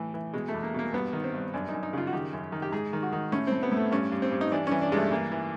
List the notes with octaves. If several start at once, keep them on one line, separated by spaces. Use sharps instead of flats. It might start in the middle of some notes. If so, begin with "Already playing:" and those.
Already playing: A2 E3
E3
B2 G#3
A3
E2
A#3
B2 A#3
G2 B3
D#3
C4
G2
F#2 D4
D#4
F#2
D#4
C#3 F4
F#4
D#3 G4
F#2
D#3
G4
G#2 G#4
D#3
F#4
D#3
A2 C#4
A2 C4
B3
A2
A3
G2 C#4
G2
C4
G2
D#4
E3 D4
E3 C#4
D4
G2 G#3 A3
E3 A#3
E3